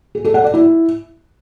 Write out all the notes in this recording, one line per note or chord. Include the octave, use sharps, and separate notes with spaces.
G#4
A4
F#5
D5
E4